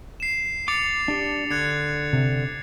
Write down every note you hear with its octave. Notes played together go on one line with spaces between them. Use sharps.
C7 E7
D6 A6 C#7 F7
D4 G4
D3 F#6 G#6 C#7
C3